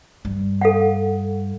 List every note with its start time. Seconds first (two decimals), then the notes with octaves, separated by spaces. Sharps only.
0.25 G2
0.61 A4 F5 F#5